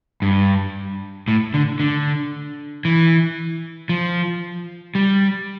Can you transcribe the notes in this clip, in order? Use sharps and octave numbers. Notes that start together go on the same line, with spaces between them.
G2
A2
D3
D3
E3
F3
G3